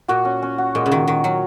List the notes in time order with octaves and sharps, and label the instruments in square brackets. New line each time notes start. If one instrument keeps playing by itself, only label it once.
[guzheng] A#2 [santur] F#4
[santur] C#4
C#4
F#4
[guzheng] A#2 [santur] G#3
[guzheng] C#3
[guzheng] D#3 [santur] F#4
[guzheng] D#3 [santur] F#4
[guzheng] F#3 [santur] C#4